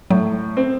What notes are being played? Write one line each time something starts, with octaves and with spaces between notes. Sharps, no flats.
A2 F#3
C4